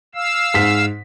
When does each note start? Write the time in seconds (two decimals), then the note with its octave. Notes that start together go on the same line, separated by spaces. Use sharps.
0.15 F5 E6
0.54 G#2 B6